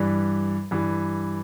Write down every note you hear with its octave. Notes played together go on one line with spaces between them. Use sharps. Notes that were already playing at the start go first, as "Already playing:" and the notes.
Already playing: G2 E3 G3
G2 E3 G3